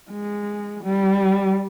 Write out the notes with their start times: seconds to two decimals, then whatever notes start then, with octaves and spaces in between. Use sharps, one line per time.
0.11 G#3
0.84 G3